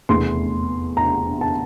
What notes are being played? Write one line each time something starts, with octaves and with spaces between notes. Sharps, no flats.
F1 E2 E3 A3 C6
A#5
A5